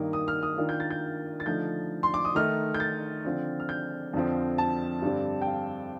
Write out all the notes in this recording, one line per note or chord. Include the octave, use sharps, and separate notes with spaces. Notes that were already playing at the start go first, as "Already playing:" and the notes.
Already playing: G2 D#3 A#3 D#4
D#6
F6
D#6
D#3 A#3 D4 F4
G6
A6
G6
A6
D3 F3 A3 D#4 G6
C6
D6
D#6
D#3 A3 D#4 F6
G6
A6
D3 F3 C4 F4
F6
G6
F2 D3 F3 C4
A5
G2 D3 G3 C4
G5
F5